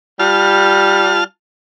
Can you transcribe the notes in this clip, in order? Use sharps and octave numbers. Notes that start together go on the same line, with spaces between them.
G3 F4 A5 F6